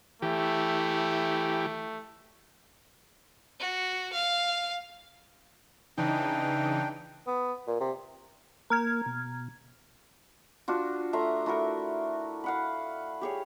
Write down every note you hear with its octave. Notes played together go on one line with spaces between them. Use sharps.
E3 A3 G4
F#4
F5
C#3 E3 D4 D#4 G5
B3
A#2
C3
A#3 A#5 F6 G#6
B2
D4 F4 F#4
A3 E5 A#5 C6
A3 E4 F#4 A#4
F5 F#5 B5
G4 G#4 C#5